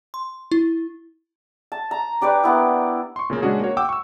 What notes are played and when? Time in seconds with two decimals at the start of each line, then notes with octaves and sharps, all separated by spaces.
0.14 C6
0.52 E4
1.72 A5
1.91 A#5
2.21 D4 G4 B4 D5
2.43 A#3 B3 E4
3.16 C6 C#6
3.30 A#2 C#3 A#3
3.42 G#3 C#4 D4 F#4 G#4
3.60 A#3 F#4 C#5
3.77 F#5 G5 D6 E6
3.89 C#6 E6